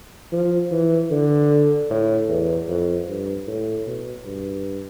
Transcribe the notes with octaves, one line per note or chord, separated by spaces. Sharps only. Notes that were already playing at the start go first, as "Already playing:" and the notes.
F3
E3
D3
A2
E2
F2
G2
A2
B2
G2